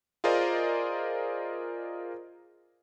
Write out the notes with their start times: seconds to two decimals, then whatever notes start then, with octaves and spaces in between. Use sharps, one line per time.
0.24 F4 G#4 A#4 C5 D5 D#5